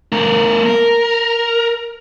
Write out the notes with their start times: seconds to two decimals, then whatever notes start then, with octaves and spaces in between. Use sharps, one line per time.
0.12 A3 A#4
0.66 A#4